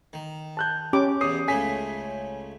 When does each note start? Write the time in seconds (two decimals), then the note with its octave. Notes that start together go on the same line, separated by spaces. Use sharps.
0.13 D#3
0.57 A5 F#6 G6
0.93 C#4 G4 D6
1.21 E2 B2 D#6 C7
1.48 C#2 C#3 A3 G#5 B6